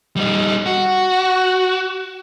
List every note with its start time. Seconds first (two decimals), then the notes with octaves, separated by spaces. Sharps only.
0.16 G3 D#4
0.66 F#4